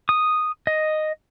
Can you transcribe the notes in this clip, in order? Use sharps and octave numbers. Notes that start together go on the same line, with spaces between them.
D#6
D#5